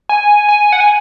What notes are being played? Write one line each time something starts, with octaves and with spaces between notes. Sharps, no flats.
G#5
G#5
F#5
G#5